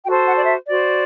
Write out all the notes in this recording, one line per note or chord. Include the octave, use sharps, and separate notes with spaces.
F#4 A4 C5 G5
F#5
D5
E5
F#4 C5 D5